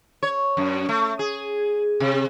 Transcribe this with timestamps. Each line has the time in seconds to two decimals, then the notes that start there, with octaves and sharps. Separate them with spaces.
0.23 C#5
0.57 F#2
0.89 A3
1.19 G#4
2.00 C3